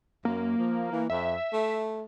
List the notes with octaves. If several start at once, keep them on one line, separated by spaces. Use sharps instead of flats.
F#2 A#3
F3
E3
F2 E5
A3